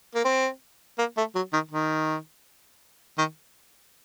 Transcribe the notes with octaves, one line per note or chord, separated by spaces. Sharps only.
A#3
C4
A#3
A3
F#3
D#3
D#3
D#3